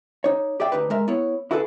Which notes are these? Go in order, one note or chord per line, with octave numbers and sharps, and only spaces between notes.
D#4 C#5
G4 G#4 D5 E5 G5
D2 D#4 G4 B4
G#3 A#4 E5
B3 E4 C#5
E4 F#4 G#4 A4 B4